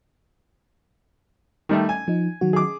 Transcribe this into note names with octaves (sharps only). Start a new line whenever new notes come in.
D#3 G3 A3
G#5
F3 D#4
D#3 F#3 F#4
G#4 D6